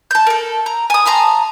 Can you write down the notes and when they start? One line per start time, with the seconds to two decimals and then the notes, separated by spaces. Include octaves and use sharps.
0.11 A5 G6
0.27 A4 A#4
0.66 A#5
0.90 G#5 D#6
1.05 A5 A#5 C6 D#6